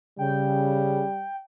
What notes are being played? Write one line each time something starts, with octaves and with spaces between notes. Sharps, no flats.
C#3 G3 G5